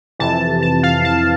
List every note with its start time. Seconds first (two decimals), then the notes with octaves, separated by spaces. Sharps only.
0.19 F2 C3 E3 A5
0.62 A5
0.83 F5
1.05 A5